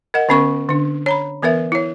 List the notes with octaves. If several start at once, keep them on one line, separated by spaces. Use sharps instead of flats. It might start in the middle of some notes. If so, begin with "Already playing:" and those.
A#4 D#5 F#5
D3 B3 C#4 A#4 C#6
D3 D4
C#5 A#5 B5
E3 B3 A#4 B4 E5
E4 C#5